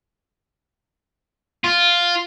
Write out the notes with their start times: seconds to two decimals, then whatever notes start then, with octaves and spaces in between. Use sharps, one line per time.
1.64 F4